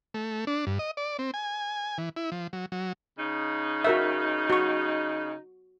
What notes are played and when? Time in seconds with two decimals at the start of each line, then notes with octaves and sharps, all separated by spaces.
0.14 A3
0.47 D4
0.67 G2
0.79 D#5
0.97 D5
1.19 C4
1.34 G#5
1.98 E3
2.16 E4
2.32 F3
2.53 F#3
2.72 F#3
3.18 C#3 D#4
3.84 F#4 A#4 E5
4.50 F#4 C#6